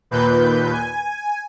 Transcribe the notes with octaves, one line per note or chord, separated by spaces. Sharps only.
D#2 A#2 B4 G6
G#5